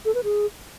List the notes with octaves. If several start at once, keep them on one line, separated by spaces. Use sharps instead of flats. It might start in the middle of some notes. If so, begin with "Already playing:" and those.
A4
B4
G#4